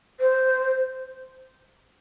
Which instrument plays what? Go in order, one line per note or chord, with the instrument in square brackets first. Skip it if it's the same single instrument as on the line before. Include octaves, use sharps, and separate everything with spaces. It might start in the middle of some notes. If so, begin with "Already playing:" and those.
[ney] C5